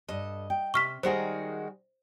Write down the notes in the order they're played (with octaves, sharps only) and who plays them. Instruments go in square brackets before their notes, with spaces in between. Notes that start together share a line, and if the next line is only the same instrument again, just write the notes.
[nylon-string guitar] G2 A4 [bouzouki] D#5
[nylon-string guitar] G5
[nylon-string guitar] C3 [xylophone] C#6 F6 B6
[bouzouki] D#3 G#3 F#4 [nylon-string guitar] G3 D#4 G#4 [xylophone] C5